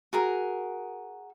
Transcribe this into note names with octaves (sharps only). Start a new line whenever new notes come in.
F#4 G#4 A#4